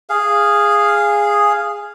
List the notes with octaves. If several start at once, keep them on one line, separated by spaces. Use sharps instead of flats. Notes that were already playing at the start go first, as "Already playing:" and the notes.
G#4 F5